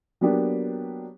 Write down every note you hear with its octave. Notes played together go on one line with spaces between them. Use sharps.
F#3 A#3 B3 D4 G4